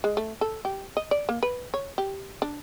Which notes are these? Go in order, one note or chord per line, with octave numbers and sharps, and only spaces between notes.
G#3
A3
A4
G4
D#5
D5
A#3
B4
C#5
G4
D4